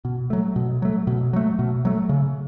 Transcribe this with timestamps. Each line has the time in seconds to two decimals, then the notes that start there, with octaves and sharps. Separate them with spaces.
0.05 B2
0.30 F#3 A3
0.56 B2
0.82 F#3 A3
1.07 B2
1.33 F#3 A3
1.59 B2
1.85 F#3 A3
2.09 C#3